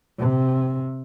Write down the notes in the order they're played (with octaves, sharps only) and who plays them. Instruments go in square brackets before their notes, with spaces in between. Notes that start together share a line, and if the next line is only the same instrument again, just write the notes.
[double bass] C3